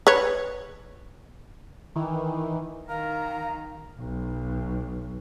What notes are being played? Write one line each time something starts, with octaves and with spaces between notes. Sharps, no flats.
B4 C#5
D#3 E3
D#3 A#4 F5 A#5
B1